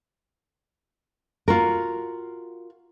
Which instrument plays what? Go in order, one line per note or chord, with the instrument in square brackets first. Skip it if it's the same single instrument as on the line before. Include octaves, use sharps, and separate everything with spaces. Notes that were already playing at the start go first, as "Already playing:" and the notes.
[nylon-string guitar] F4 F#4 A#4